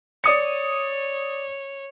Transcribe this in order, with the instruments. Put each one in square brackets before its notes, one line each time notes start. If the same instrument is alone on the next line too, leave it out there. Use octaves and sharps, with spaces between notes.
[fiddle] C#5 [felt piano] D5 D#6 C#7